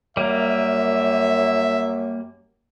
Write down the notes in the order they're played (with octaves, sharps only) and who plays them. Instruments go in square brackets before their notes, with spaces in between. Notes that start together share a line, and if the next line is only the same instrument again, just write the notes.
[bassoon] F#2 [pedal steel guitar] G3 A#3 [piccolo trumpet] E5